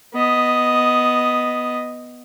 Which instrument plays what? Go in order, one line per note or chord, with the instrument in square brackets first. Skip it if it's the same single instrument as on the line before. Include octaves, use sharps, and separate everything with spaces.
[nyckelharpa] B3 D#5